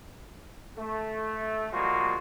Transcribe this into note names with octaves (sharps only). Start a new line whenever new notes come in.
A3
F3 G3 G#3 A#3 F4 F#4